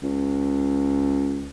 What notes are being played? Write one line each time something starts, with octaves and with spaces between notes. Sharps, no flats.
C#2